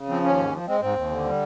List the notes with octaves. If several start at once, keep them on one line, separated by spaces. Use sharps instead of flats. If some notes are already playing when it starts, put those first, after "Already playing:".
Already playing: C#3
F3 C4
D#2 C#4
G#2
F3
G#3 C4
G#2 C4
D#2
D3
G3